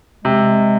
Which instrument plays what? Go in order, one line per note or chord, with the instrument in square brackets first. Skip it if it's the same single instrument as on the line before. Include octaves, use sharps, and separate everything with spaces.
[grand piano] C3 [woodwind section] G#3